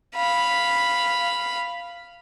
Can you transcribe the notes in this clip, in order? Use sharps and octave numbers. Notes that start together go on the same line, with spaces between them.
F5 B5